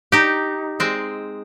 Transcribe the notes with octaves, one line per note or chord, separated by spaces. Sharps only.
D#4 G4
G#3 C4